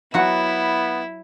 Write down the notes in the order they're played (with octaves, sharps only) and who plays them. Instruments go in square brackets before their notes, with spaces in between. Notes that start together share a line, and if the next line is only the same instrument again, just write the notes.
[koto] F#3 F#4 [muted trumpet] B3 [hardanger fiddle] E4